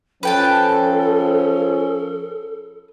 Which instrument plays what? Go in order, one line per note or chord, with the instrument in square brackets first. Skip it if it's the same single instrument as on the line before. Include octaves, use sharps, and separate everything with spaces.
[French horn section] F3 C#4 [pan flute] A4 [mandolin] B4 G5 A5